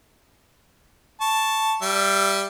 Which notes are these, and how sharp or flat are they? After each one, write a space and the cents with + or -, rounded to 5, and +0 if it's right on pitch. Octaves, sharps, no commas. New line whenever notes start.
A5 +0 C#6 +0
G3 +0 E5 +25